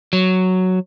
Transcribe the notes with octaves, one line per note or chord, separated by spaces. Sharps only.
F#3